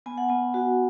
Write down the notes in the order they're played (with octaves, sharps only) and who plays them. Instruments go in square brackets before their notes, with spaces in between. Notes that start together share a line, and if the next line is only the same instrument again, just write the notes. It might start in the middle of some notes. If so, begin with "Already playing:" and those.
[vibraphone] B3 G#5
F#5
B3 G#5
F#4